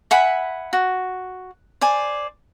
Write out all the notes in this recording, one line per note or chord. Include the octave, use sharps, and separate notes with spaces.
E5 F#5 G#5 B5
F#4
C5 D5 G#5